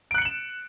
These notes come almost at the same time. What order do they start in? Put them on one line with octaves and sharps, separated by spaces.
D7 F#6 C#7 F#7 E7